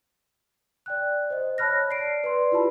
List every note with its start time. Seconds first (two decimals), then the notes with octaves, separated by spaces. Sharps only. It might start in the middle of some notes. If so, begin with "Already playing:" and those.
0.86 D5 G5 F#6
1.30 C5 D#5
1.58 C#5 A5 B5 F6 F#6 A#6
1.90 D5 C7 D7
2.24 B4 D5 C6
2.52 E4 F4 G4 B4 A5 B5